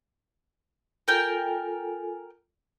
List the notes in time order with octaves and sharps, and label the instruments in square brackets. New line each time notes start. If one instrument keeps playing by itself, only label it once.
[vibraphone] F4 A4 G#5 [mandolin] A#4 G5